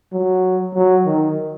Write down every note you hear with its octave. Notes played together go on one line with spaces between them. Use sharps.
F#3
F#3
D#3